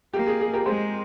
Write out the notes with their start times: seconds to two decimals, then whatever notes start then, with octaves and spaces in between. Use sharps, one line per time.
0.14 A#3 G4
0.27 G#4
0.41 G#4
0.54 G4 A#4
0.66 G#3 G#4 C5